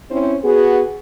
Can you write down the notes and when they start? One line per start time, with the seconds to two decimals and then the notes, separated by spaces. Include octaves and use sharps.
0.10 C4 C#4 E4 C5
0.44 B3 F#4 G#4